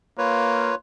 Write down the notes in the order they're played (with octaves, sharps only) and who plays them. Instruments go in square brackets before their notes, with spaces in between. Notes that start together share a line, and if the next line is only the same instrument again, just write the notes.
[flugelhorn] A#3 [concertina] F4 B4 C#5